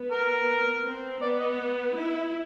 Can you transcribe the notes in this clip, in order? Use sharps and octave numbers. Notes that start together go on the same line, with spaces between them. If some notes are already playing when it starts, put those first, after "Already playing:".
Already playing: B3
A#4
C4
B3 D5
D#5
E4